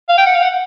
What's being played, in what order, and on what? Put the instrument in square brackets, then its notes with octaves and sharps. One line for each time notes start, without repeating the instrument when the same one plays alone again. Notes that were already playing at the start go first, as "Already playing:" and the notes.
[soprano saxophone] F5
G5
F#5
F5
F#5